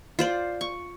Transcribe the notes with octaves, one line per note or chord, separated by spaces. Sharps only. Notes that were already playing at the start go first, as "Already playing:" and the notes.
F4 C5 D5
C#6